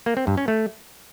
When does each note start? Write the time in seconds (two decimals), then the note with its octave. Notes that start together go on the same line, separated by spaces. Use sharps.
0.06 A#3
0.17 C4
0.27 G2
0.37 C#4
0.48 A3